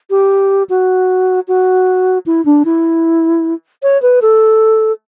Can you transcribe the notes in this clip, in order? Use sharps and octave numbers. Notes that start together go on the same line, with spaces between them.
G4
F#4
F#4
E4
D4
E4
C#5
B4
A4